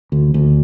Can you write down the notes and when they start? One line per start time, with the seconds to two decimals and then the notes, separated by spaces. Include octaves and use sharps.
0.12 D2
0.34 D2